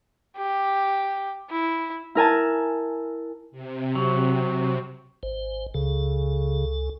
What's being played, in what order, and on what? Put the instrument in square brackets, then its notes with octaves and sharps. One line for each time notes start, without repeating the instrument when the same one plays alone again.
[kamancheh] G4
E4
[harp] E4 A#4 G#5 A5
[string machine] C3
[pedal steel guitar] F#3
[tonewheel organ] G#1 C5
[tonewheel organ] C#2 A4 [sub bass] C#3